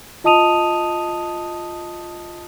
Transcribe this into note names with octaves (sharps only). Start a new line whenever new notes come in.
F4 D#5 A5 D#6 D#7 F7